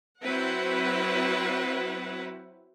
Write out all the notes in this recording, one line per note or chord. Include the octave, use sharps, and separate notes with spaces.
F#3 C4 E4 B4 F#5